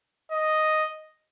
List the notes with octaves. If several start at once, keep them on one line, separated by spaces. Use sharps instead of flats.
D#5